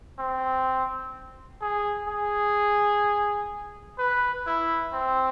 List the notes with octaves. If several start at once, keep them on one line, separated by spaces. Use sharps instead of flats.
C4
G#4
G#4
B4
E4
C4